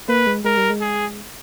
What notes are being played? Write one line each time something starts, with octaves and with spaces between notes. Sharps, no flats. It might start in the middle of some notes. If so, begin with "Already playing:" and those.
A#3 B4
G#3
G#3 A#4
G3
G#3
G#4